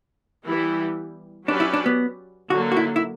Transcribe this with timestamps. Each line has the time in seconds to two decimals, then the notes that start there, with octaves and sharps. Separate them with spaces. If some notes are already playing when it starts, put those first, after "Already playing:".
0.45 E3 G3 B3 E4 G4
1.48 F#3 C#4 D4 G4 B4 D5
1.60 E4
1.73 D4
1.86 B3
2.50 D3 F#3 A#3 F#4
2.72 F#4
2.77 E4
2.96 E4